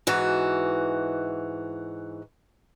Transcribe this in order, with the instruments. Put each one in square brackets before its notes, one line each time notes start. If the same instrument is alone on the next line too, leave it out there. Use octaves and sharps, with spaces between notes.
[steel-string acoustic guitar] G#2 E3 F#4